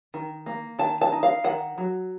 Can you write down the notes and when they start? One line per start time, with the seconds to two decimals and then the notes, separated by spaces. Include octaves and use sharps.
0.14 D#3
0.46 A#3
0.79 D#3 A5
1.01 A5
1.12 D#4
1.23 F5
1.44 D#3 F#5
1.78 F#3